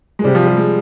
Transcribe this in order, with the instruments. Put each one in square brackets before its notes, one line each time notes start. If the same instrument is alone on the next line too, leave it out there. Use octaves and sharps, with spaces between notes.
[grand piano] G#3
[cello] C3 [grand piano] G3
[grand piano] F3
G3
G#3